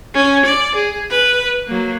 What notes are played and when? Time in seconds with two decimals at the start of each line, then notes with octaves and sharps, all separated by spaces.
0.15 C#4
0.46 D5
0.75 G#4
1.10 B4
1.68 F#3 A#3